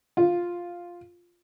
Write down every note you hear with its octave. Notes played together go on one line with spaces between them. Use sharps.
F4